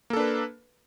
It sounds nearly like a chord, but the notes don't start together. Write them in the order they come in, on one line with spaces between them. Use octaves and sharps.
A#3 A4 D4 B4